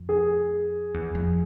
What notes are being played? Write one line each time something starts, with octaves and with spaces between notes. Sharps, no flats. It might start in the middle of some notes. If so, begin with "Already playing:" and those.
Already playing: F2
G#4
E2
F2